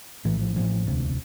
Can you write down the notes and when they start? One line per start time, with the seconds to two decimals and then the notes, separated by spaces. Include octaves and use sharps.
0.25 A#1 A2 E3
0.40 F3
0.56 A1 A2 F3
0.86 E1 D2 C3